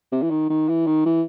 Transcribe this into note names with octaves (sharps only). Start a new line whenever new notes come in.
C3
E3
D#3
D#3
E3
D#3
E3